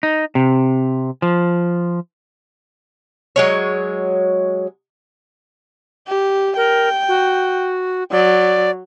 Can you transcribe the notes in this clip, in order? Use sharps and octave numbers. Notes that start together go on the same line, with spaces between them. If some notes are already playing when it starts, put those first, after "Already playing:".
D#4
C3
F3
F#3 G#3 C#5
G4
A#4 G5
F#4
F#3 D5